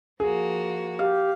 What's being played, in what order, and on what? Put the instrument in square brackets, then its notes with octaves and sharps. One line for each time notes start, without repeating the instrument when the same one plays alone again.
[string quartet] F3 A#3 F#4 [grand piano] G#4
[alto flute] G4 [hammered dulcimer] F5